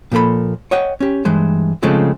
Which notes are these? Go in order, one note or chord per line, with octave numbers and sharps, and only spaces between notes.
A#2 F3 A#3 A4 B5
C#5 D#5 F#5 G5
C#4 G4
G2 E3 G#3 C5
C#3 F3 G#3 A3 C4